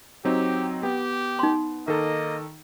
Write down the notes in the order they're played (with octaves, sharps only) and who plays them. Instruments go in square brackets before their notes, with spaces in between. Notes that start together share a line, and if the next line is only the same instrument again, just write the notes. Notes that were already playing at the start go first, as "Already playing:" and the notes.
[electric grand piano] F#3 C4 D#4 [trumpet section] G4
[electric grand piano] B3 [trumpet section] G4
[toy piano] D#4 C6
[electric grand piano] D#3 A4 [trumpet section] A#3 D#5